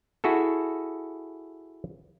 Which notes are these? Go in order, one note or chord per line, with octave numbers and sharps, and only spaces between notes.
E4 F#4 G#4 A4